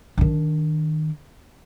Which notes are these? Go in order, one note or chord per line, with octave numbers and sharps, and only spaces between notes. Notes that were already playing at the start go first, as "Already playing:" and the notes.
D#3 D4